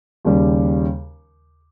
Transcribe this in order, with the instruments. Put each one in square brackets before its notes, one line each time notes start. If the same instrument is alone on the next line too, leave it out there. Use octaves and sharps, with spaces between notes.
[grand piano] D#2 C#3 G3